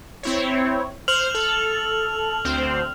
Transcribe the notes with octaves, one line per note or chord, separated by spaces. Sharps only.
C4 E4 C#5
C5 F6 F7 F#7
A4
D2 C4 C5